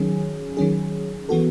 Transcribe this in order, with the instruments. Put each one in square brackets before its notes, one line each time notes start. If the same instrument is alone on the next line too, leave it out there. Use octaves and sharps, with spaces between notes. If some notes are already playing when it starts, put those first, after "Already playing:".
Already playing: [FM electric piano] D#3 F#3 C#4 G#4
D#3 F#3 C#4 G#4
E3 B3 F#4 A4